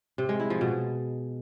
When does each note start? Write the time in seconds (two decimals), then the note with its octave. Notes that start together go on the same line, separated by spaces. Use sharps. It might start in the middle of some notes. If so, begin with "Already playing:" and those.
0.18 C3
0.29 G#3
0.40 E4
0.50 F3
0.61 B2